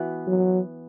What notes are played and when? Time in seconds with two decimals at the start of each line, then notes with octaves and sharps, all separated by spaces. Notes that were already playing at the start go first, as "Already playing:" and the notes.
Already playing: E3 B3 F#4
0.27 F#3